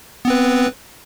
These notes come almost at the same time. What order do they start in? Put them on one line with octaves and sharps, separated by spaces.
B3 C4 B4